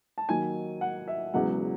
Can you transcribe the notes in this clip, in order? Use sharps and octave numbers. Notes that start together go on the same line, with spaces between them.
A5
D#2 D#3 F#3 G#5
F#5
E5
E1 E2 C#3 F#3 F#5